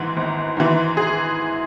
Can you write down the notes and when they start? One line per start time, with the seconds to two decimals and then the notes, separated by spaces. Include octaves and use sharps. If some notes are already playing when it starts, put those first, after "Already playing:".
Already playing: G#1 G#2 E3
0.17 G#1
0.57 G#2 E3
0.97 G#4